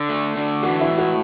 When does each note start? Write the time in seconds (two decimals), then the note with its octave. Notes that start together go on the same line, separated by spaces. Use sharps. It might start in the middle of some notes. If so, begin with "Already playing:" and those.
Already playing: D3
0.09 A3
0.36 D3
0.63 E3 F#4
0.81 E4
0.90 A2
0.98 F#4